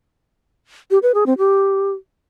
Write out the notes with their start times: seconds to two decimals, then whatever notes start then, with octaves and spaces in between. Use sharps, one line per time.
0.91 G4
1.03 B4
1.14 G#4
1.26 C4
1.38 G4